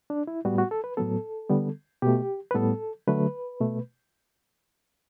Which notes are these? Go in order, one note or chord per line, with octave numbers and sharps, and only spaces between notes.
D4
E4
A2 G3 B3 F#4
F#4
A4
B4
A2 F#3 B3 A4
D3 G3 B3
B2 A3 G4
B4
A2 G3 B3 A4
D3 F#3 A3 B4
B2 A3